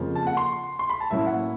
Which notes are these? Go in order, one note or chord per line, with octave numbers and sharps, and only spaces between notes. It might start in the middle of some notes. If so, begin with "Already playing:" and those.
Already playing: F2 C#3 F3 A#3
A5
F#5
C6
C6
B5
A5
A2 F#3 A#3 C#4 E4 E5
F#5